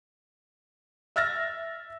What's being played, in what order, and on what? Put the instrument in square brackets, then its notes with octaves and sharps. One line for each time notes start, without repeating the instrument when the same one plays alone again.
[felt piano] E5 E6 F6 A6 A#6